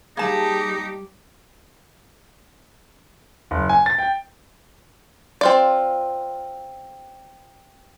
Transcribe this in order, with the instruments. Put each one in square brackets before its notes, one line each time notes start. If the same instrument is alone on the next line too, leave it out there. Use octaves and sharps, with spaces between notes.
[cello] G3 G4 [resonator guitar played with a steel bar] A#3 A5 [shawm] D#4 [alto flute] G#4
[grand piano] F#1
G#5
A6
G5
[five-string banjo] C4 F4 D5